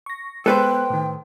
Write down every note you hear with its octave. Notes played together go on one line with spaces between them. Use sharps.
C#6 A#6
G#3 B3 A4 B4 C5 G5 F#6
A2 D#3